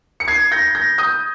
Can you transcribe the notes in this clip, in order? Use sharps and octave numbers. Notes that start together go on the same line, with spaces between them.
C#7
G#6 C7
G6 A#6
G6 A#6
D#6 G6